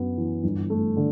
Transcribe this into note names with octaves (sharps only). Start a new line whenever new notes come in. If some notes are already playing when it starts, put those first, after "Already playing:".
Already playing: F#2 B3 F#4
E3
G1
A3
D3